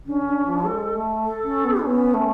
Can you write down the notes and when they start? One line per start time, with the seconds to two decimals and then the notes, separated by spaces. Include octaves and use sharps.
0.05 D3 C#4
0.25 D3
0.45 F3
0.65 G#3 A4
0.95 A3
1.25 A4
1.44 C#4
1.64 B3
1.83 B3 C#4
2.14 A3